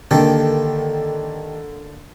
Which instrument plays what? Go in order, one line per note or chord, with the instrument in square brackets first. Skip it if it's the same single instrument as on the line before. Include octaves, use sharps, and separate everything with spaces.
[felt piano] D3 A#3 [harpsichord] D#3 G4 A4